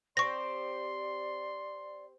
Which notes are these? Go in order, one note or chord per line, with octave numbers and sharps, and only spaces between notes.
C4 G4 C5 D5 C6 C#6 A#6